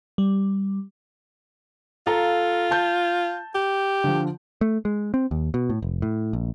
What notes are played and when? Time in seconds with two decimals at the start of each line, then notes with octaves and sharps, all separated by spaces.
0.18 G3
2.07 F4 A4 F5 A#5
2.71 A5 G6
3.55 G4
4.04 D3 F3
4.61 A3
4.85 G#3
5.14 C4
5.31 D#2
5.54 B2
5.70 A2
5.83 F1
6.02 A2
6.33 A#1